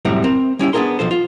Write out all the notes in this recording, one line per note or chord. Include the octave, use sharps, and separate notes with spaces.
F#2 A2 C3 E3 G3 A#5
C4 A#4
G3 C#4 E4 G5
B3 D4 F4 G#4 A#4 C6
B1 F3 A4 C5
F4